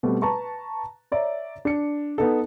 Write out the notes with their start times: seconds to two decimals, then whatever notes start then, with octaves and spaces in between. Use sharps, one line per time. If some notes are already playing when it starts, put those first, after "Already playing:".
0.03 B2 G3 A3 C4
0.22 B4 A5 A#5 C#6
1.12 C#5 D5 E5 A#5
1.65 D4 C#7
2.18 B3 D#4 A4